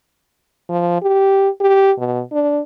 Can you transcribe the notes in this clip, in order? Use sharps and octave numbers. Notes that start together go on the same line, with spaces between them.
F3
G4
G4
B2
D4